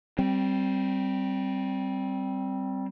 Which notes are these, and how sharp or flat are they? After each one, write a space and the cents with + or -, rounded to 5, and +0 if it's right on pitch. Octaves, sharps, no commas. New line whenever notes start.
G3 -15 C4 +0